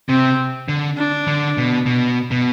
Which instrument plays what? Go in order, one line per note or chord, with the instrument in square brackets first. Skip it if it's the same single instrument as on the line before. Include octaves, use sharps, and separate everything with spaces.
[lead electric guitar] C3 [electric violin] C4
[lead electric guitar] D3
[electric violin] D4
[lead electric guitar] D3
B2
B2
B2